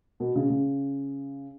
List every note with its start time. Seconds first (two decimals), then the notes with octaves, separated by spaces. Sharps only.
0.20 B2
0.36 C#3
0.50 C#3